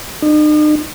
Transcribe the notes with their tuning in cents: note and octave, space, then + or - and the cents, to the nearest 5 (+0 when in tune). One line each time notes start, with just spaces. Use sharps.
D#4 -45